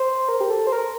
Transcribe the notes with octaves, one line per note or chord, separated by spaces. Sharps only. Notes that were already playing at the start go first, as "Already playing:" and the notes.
Already playing: C5
A#4
G4
A4
C5
A#4